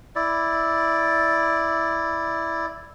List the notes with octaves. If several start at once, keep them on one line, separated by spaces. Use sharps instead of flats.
E4 D5